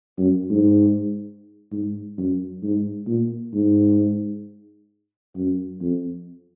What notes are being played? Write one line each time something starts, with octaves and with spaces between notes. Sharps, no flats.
F#2
G#2
G#2
F#2
G#2
A#2
G#2
F#2
F2